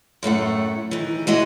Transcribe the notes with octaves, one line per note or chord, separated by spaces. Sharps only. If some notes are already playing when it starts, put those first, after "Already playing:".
F#2 A2 A3 F#5
D#3 E3
E3 G#3 F#4 D#5